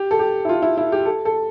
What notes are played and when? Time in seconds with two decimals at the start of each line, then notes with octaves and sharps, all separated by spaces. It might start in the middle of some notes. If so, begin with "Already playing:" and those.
Already playing: G4
0.11 A4
0.19 G4
0.45 E4
0.49 F4
0.62 E4
0.77 E4
0.92 G4
1.05 A4
1.25 A4